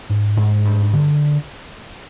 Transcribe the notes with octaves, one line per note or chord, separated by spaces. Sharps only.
G#2
G#2
G2
D3